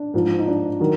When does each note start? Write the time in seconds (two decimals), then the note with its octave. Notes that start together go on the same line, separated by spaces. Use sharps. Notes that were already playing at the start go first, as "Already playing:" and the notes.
Already playing: D4
0.14 G#2 F3
0.39 D#4
0.48 D4
0.80 D#3 F#3